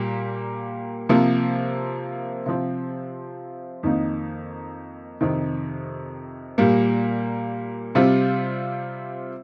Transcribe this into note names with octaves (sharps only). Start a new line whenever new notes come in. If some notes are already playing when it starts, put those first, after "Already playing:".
Already playing: A#2 G3 A#3 G4
C3 F3 A#3
C3 F3 C4
F2 D#3 A#3 D#4
F2 C3 D#3
A#2 G3 A#3
C3 G3 C4 F4